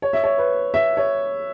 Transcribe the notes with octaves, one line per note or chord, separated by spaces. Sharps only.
C#5
E5
C#5
B4
E5
C#5